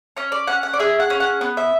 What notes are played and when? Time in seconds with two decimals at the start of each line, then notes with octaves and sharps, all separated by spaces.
0.17 C#4 C#5
0.32 D5
0.47 C#4 F#5
0.63 F#5
0.73 D5
0.79 G#4 E5
1.00 F#5
1.10 C#4
1.20 F#5
1.41 B3
1.57 E5